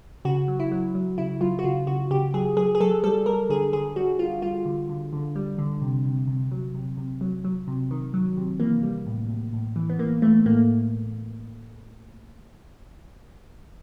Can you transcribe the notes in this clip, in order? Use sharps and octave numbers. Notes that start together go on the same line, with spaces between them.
C#3 F#4
F#3
E4
F#3
F#3
C#3 E4
F#3 F4
F#4
C#3 F4
C#3 F#4
C#3 G4
F#3 G#4
F#3 G#4
G#4
F#3 A4
G3 A4
G3 A#4
D3 G#4
D3 G#4
G3 F#4
G3 F4
G3 F4
D3
D3
D3
G3
D3
C3
C3
C3
F#3
C3
C3
F#3
F#3
C3
D#3
F#3
C3
E3 A#3
G3
A2
A2
A2
E3
B3
E3 A#3
E3 A3
A2 A#3